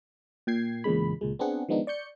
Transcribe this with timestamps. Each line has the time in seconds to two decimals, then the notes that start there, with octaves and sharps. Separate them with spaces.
0.47 A#2 G5 G#6 C7
0.84 E2 A#2 C#3 G#3 B5
1.21 C#2 A#2 G#3
1.39 B3 C4 D4 G#4 F#5
1.69 D#3 F3 G#3 B3 D4 D#4
1.87 D5 C#6 G6 C#7